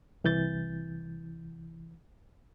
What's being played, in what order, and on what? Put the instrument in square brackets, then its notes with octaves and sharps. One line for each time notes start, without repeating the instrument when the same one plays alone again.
[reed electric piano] C2 E3 G6 A6